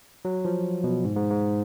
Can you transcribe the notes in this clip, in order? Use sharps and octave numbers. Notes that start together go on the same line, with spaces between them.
F#3
F3
B2
G#2
G#2
G#2